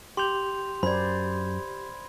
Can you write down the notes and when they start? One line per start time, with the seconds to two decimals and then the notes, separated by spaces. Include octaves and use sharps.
0.17 G4 C6 G6 F7
0.83 F#2 C5 D5 B5 G#6